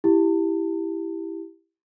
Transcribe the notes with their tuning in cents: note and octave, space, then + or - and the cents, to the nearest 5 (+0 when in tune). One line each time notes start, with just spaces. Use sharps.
E4 +0 G4 +0 A5 +35